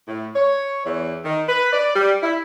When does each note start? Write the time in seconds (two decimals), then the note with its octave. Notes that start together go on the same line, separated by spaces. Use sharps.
0.08 A2
0.36 C#5
0.85 E2
1.24 D#3
1.49 B4
1.73 D5
1.95 G3
2.23 E4